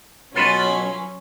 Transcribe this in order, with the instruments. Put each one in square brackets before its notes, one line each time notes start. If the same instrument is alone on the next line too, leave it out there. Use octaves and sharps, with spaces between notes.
[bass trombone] B2 [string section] F#3 C#4 [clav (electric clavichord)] F4 A4 B4 [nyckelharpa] B5 C6